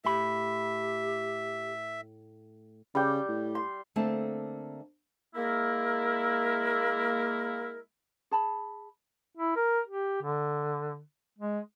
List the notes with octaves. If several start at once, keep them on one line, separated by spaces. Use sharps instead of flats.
A2 G4 E5 B5
C#3 G3 G5
A2
C6
D3 A3 A#3 C4 D4 A5
G#3 A#3 E4 A#4
G#4 A5 B5
E4
A#4
G4
D3
G#3